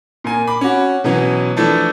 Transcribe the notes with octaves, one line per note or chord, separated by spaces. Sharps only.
A#2 A#4 G#5
B5 D6
C#4 F#4
B2 E3 F#3 B3 C#4
E3 F3 A3 D4 E4 A4